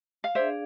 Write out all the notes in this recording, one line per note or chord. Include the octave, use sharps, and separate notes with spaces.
F5
D4 G#4 C5 D5 E5 F5